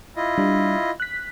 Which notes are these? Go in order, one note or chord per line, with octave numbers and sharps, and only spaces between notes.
E4 F4 D#5
G3 D4
F#6 B6